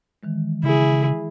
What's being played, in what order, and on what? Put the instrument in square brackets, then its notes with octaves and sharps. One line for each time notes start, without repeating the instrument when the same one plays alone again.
[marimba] D#3 E3 G#3
[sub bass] C#3 [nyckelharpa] E4 G#4